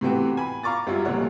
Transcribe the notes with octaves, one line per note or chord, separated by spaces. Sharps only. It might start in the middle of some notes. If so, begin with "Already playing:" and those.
A2 C3 E3 B3 C4 F#4
G#5 B5
F5 A#5 C#6 D6 A6
F#2 F#3 G3 E4 F4
F1 A#2 G3 C#5 F#5